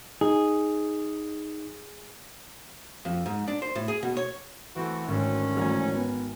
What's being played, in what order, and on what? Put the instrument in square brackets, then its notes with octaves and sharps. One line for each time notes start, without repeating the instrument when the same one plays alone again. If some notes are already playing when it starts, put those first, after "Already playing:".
[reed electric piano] D#4 [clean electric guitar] G#4
[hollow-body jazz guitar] F2
G#2
D4
C5
A2
G#4
B2
C#5
[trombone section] E3 A3 F#4 [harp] C4
[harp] G#1 [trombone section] D2 C#4
[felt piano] G#1 A2 E3 [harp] G#5 A#5 F6
[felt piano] B3